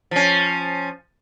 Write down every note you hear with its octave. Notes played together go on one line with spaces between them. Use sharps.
F3 C#4